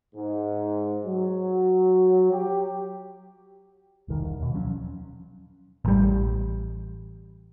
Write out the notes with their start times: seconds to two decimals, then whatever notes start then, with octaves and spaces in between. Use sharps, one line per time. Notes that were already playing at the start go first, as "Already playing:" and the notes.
0.15 G#2
1.05 F#3
2.31 G4
4.08 E1 C2 D#3
4.39 D#2 B2
4.53 F3 F#3 C#4
5.85 A1 G3